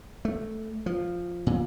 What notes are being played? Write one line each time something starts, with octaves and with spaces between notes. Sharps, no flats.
A3
F3
A#2